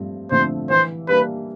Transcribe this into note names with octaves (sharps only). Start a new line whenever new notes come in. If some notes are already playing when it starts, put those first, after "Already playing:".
Already playing: G2 F3 A3 C4
D3 F3 A3 C4 C5
E3 C5
G3 A#3 D4 B4